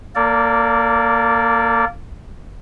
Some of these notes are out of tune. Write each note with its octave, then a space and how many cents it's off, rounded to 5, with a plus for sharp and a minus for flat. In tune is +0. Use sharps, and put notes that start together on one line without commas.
A#3 +0 A4 +45 D5 -20